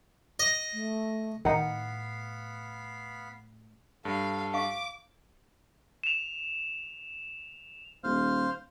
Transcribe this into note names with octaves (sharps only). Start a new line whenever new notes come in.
D#5
A3
A2 D#3 B3 D#4 F5 F#5 B5
G2 A4 F5
F5 C#6 D6
E7 F7
D#1 C5 F5 F6